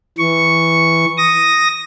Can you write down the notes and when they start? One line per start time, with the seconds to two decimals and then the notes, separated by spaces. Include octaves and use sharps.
0.18 E3 C#6
1.18 D#6 A#6